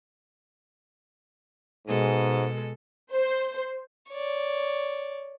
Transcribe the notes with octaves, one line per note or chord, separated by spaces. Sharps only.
G#2 B2 G#3 A4
C5
C#5 D5